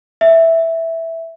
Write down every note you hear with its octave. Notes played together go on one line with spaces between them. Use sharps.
E5